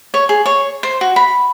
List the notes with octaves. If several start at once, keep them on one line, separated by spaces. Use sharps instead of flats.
C#5
G#4
C#5
C5
F#4
B5